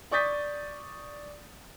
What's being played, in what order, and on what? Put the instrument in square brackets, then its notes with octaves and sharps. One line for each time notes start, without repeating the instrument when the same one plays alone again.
[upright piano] D5 C#6 D#6 G6 A6 B6